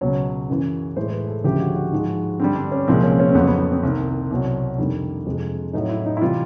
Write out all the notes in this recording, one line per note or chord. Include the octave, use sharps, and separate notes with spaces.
C#2 B2 F#3 C#5
F#2 C#3 E3
A2 E3 G#3 C5
B4
A4
D2 C#3 F3 G#3 G4
F#4
F#4
G#2 F3 G#3
G2 D3 G3 C4
D4
C#4
C2 A#2 F3 G#3 C4
C#4
C#4
C4
F2 C#3 F#3 B3
B3
B3
C4
C2 C3 D#3
C2 B2 F#3
F2 C3 D#3 G3 D4
F2 C3 F3 G#3
A2 F#3 D#4
E4
D#4
E4
C3 E3 G3 F4